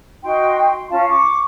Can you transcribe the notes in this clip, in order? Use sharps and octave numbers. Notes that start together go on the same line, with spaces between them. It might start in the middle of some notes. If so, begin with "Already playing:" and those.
D#4 F#4 G5 C6
C6
C#4 F4 F5 A5
C#6 D6